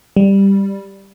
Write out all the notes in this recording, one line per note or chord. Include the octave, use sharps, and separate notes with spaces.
G3